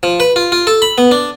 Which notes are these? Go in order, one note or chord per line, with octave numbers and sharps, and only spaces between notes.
F3
B4
F4
F4
A4
B5
B3
D4